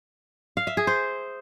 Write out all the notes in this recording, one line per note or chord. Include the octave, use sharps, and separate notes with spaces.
F5
E5
G#4
C5